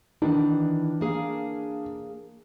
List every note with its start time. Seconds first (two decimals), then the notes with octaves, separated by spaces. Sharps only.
0.22 D#3 E3 D4
1.01 A#3 G#4 F5